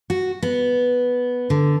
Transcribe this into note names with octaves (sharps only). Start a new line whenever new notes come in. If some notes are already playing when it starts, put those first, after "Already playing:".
F#4
B3
D3